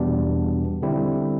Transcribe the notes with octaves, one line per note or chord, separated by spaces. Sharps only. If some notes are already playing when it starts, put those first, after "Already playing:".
Already playing: E2 B2 G3 B3 D4
D3 G3 C4 E4